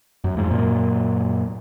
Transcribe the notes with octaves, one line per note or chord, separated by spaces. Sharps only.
F#2
F2 G#2
F#2 A#2